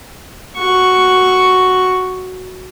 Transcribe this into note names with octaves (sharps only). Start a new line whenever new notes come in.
F#4 C#6